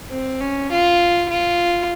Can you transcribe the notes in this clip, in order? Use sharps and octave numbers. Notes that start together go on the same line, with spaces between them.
C4
C#4
F4
F4